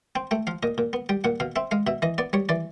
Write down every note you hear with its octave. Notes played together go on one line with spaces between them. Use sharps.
C4 G5
A3 G5
F3 F5
A#2 D#5
A#2
B3
G3 G5
A#2 F#5
B2 F5
C4 E5
G#3 F5
B2 E5
E3 D#5
B3 D5
G3 C#5
E3 D5